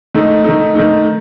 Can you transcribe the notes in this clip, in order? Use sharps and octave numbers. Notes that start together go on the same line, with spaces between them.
D#3 A3 D#4
D#3 A3 D#4
D#3 A3 D#4